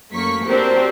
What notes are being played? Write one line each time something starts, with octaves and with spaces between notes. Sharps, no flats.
F#2 A3 A#3 C#6 B6
C4 D4 F#4 G4 A#4 C5